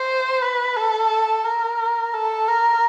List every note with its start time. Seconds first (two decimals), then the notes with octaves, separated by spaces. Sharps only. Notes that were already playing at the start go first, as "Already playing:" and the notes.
Already playing: C5
0.42 B4
0.76 A4
1.44 A#4
2.13 A4
2.47 A#4